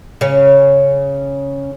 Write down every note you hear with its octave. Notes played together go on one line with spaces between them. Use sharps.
C#3 C#4